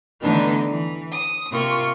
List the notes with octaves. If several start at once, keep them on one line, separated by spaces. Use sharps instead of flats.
D3 E3 A3 B3 D4 D#4
E3
D#6
C3 A#3 F4 C#6